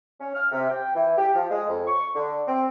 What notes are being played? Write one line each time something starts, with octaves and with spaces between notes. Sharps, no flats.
C#4
F6
C3
G5
E3
G4
F3
G#3
F2
C#6
D3
C4